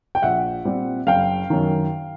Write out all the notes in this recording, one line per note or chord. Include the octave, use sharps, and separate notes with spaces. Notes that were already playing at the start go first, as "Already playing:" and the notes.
G5
A#1 E5 F#5
A#2 G3 C4
F#1 F5 G5
F#2 D#3